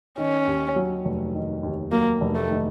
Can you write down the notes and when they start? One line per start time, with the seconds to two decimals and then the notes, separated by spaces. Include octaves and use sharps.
0.18 D#3 C#4
0.47 D#2
0.76 F#3
1.05 F1
1.34 D#3
1.63 D#2
1.91 F#3 A#3
2.21 F1
2.35 A3
2.50 D#3